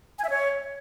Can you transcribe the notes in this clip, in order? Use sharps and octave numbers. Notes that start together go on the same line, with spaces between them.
G#5
E5
C#5